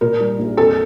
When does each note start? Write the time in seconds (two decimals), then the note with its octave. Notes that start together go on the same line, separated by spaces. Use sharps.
0.01 A#2 A#4
0.20 G3
0.39 A#1
0.57 F2 A4